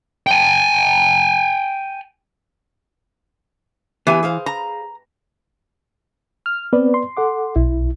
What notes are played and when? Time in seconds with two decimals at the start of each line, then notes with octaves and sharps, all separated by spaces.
0.27 G5 G#5
4.07 E3 B3 G4 G#5
4.23 G#4 C5 F5
4.46 A#5
6.46 F6
6.73 B3 C4 B4 D5
6.94 C6
7.17 A4 F#5 D6
7.56 B1 E4